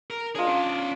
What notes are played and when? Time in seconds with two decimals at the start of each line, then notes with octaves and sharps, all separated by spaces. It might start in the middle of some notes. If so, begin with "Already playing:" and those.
0.10 A#4
0.35 D4 F4 G#4 D#5
0.47 C#4 D5